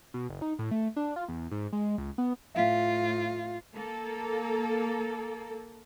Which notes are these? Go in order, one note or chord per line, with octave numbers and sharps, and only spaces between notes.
B2
F#1
D#4
A2
A3
D4
F4
E2
G#2
G#3
C#2
B3
A2 F4 E5 F5 B6
A#3 A4